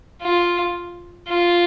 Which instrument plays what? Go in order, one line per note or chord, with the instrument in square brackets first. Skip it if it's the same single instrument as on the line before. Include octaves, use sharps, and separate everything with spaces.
[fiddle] F4
F4